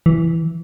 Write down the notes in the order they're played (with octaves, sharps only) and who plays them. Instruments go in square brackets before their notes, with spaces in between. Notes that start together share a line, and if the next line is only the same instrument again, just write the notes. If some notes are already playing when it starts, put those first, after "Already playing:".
[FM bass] E3